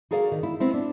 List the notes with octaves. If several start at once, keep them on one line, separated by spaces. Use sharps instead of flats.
F#4 G#4 A#4 D5 F5
D#3
E4
B3 C4 E4
D4